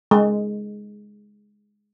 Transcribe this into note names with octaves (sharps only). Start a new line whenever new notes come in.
G#3